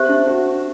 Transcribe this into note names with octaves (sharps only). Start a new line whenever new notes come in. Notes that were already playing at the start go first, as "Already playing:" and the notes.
Already playing: C4 G4 C5 E5
D4
F#4